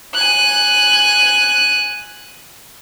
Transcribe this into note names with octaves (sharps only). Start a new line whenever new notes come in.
G#5 F#6